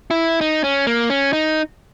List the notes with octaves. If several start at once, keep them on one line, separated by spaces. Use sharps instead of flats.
E4
D#4
C#4
A#3
C#4
D#4